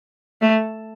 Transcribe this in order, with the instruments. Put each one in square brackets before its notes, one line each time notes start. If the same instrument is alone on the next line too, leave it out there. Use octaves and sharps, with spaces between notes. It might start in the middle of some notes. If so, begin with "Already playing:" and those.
[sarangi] A3